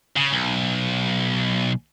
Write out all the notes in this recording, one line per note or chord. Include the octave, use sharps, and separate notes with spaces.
C#3
B1